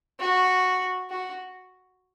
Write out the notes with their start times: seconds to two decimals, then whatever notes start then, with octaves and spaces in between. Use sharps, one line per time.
0.20 F#4
1.10 F#4